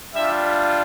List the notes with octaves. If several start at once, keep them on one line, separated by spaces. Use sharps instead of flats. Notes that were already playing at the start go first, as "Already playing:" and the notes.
G3 D4 F4 E5